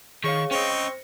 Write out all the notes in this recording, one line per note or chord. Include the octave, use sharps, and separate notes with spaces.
D#3 G#4 C#5 F5 C#6
C4 C#4 C5 D#5 G5 C#6 A#6